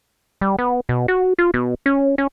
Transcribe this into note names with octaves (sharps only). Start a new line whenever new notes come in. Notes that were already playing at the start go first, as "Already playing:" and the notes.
G3
B3
B2
F#4
F4
B2
C#4
C#4